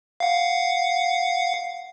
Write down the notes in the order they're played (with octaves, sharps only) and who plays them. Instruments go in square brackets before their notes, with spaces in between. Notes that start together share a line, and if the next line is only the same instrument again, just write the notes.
[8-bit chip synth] F5 F#5